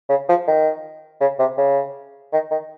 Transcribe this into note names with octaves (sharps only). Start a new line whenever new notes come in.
C#3
F3
D#3
C#3
C3
C#3
D#3
D#3